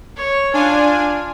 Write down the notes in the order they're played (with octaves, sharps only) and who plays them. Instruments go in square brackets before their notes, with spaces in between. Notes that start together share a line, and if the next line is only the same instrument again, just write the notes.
[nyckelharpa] C#5
[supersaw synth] D4 G#5 [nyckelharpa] F4